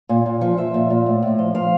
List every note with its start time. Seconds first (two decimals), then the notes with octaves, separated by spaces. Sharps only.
0.09 A#2
0.26 A#2
0.41 F3
0.57 F3 E5
0.74 A#2
0.90 A#2
1.06 A2
1.23 A2
1.39 F3
1.55 F3 F5